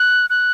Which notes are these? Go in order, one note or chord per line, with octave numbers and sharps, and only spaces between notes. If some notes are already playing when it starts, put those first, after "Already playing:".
Already playing: F#6
F#6